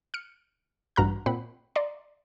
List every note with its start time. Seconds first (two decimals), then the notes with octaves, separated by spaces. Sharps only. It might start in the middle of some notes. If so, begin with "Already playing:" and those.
0.14 F6 C#7
0.96 A1 G2 F#4 A#5 F6 F#6
1.26 A#2 C4 F#5 B5
1.76 D5 A#5 C6